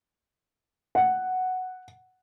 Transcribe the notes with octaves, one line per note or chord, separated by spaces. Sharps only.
F#5